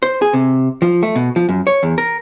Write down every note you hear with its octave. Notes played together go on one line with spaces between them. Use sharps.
C5
G#4
C3
F3
A3
B2
F3
F#2
C#5
E2
A#4